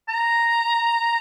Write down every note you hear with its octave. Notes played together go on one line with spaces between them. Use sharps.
A#5